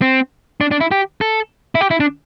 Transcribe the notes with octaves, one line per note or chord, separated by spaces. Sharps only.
C4
D4
D4
E4
G4
A4
E4
G4
E4
D4